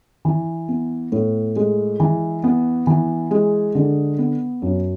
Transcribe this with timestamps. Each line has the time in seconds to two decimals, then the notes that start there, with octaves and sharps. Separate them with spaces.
0.25 E3
0.68 B3
1.12 A2
1.56 G#3
2.00 E3
2.44 B3
2.87 E3
3.31 G#3
3.75 D3
4.18 B3
4.62 F#2